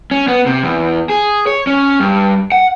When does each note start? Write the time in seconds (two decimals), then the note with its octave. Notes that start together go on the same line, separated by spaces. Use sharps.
0.11 C#4
0.28 B3
0.46 C3
0.64 E2
1.10 G#4
1.47 C#5
1.67 C#4
2.00 G2
2.52 F#5